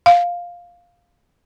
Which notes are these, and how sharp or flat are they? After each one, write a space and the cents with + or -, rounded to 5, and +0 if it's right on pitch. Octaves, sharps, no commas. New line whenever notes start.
F5 +5